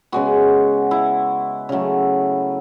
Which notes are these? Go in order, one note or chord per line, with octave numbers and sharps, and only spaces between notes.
C#3 G#3 B3 F#4
E4
C#3 F#3 A3